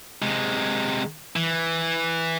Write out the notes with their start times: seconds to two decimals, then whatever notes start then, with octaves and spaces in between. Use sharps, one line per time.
0.22 C3 G#3
1.36 E3